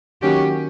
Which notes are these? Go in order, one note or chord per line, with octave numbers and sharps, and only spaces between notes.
D#3 F#3 A#3 C#4 F#4 G4